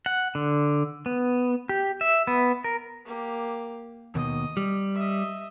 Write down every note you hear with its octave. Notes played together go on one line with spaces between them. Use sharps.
F#5
D3
B3
G4
E5
B3
A#4
A#3 G4
D#2 B2 D#5
G3
D#5 E5